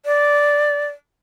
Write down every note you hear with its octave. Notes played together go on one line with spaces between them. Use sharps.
D5